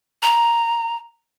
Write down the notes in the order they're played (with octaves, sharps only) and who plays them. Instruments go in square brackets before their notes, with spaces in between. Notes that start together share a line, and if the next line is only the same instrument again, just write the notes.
[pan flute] A#5